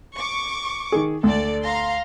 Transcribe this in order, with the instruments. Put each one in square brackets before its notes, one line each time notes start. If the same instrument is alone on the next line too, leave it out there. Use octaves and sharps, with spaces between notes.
[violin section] C#6 D6
[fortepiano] D#3 G#4
[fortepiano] D2 [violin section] A4 D5
[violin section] F5 A#5 C6